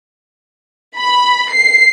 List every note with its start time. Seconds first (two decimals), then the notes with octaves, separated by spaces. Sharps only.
0.97 B5
1.53 C7